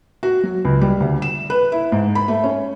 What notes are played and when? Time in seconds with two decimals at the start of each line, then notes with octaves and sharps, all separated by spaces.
0.23 F#4
0.44 F#3
0.65 C#2
0.81 G3
1.00 D2
1.22 E7
1.50 B4
1.72 E4
1.92 G#2
2.15 B5
2.28 A3
2.44 C#4